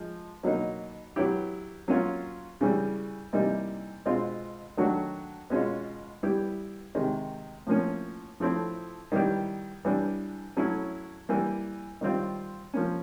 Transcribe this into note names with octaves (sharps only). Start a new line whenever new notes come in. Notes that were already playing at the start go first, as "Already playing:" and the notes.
Already playing: F3 G#3
B2 F#3 A#3 D#4
F#3 B3 E4 G4
F#3 A#3 C#4 F4
C#3 E3 G3
C3 E3 G3 A#3 D#4
B2 G#3 C4 F4
D#3 F#3 A3 D4 F#4
B2 G#3 C#4 F4
G3 B3 E4 G4
C3 D#3 G#3
A2 F3 A#3 C#4
F3 A3 C4 E4
D#3 G3 B3 E4 G4
E3 G3 B3 D4
F#3 A3 C#4 E4
E3 G3 A#3
D#3 G3 C4 F4
F3 A#3 C#4